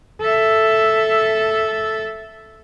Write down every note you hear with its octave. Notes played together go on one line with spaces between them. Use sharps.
A4 E5